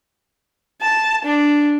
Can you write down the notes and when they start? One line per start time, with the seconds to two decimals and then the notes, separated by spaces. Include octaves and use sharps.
0.82 A5
1.25 D4